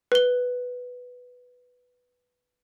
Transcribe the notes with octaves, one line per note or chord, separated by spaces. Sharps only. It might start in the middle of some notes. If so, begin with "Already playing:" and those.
B4 G7